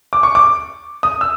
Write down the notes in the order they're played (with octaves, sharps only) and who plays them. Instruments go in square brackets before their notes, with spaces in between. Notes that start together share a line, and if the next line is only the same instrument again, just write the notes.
[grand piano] D6
C#6
D6
D#6
E6